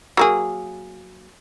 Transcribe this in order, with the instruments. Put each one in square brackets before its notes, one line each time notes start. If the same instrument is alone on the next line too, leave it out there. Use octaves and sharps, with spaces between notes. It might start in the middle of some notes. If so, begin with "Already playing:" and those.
[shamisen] F#3 A#3 G#4